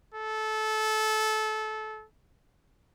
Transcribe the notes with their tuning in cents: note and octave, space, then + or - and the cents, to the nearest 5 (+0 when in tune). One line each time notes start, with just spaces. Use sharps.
A4 -20